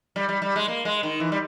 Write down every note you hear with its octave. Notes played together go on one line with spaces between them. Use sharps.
G3
G3
G3
G#3
A#3
G#3
D#3
E3
G3